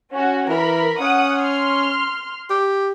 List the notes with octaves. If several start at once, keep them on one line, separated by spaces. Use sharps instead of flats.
C#4 F#4
E3 A#4 B5
C#4 F#5 D#6
C6 F6
G4